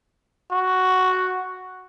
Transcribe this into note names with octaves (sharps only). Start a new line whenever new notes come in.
F#4